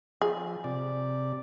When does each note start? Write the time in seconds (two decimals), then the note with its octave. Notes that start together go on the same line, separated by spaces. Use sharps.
0.22 F3 G#4
0.64 C3 D5